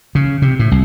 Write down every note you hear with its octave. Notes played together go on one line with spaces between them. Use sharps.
C#3
C3
A2
C2